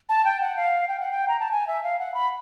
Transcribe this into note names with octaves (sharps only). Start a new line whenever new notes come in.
A5
G5
F#5
F5
G5
F#5
G5
A#5
A5
G#5
E5
F5
F#5
B5